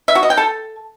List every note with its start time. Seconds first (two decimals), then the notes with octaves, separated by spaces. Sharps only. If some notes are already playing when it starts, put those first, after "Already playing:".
0.08 E5
0.15 F#4
0.23 D#5
0.30 G5
0.37 A4